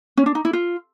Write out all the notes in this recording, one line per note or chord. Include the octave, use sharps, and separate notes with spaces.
C#4
D4
D#4
E4
F4